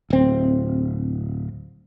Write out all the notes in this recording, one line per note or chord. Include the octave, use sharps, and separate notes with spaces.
D1 C4